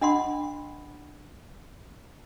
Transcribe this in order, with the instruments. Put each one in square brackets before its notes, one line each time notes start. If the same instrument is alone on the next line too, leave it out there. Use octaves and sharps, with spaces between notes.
[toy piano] D4 D#5 F#5 B5 C6